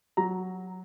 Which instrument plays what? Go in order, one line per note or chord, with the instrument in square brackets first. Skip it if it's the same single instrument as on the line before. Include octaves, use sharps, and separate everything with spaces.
[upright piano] F#3 A#5